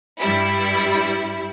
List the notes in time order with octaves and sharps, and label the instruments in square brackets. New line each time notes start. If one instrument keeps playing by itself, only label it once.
[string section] G2 G3 E4